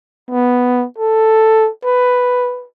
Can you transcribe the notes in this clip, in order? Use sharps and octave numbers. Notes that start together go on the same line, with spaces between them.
B3
A4
B4